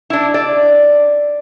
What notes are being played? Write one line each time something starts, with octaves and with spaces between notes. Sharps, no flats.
D4 E4
D5